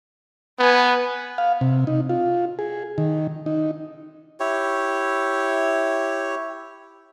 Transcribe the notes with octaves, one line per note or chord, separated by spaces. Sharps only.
B3 B4 G#5
F5
C3
D#4
F4
G#4
D#3
D#4
E4 G4 C#5